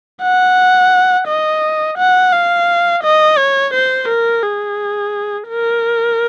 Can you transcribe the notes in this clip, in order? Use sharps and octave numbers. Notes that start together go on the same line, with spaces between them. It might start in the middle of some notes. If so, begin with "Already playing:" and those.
F#5
D#5
F#5
F5
D#5
C#5
C5
A#4
G#4
A#4